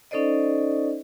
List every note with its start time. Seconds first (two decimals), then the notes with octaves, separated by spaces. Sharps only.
0.11 C#4 D#4 A4 C5 D5 D#5